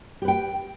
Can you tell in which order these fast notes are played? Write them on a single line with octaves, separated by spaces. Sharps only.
G4 B4 G5